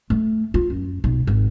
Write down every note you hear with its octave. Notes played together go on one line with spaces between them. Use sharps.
A3
F4
F#2
B1
G#1